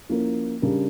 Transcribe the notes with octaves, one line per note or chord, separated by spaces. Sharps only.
F3 A#3 C#4 E4 A#4
C#3 G3 D4 G4 A#4